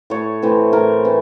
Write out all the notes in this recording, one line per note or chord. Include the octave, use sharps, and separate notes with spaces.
A2 C#5
E3 A3 C4
A2 A#4
E3 A3 C4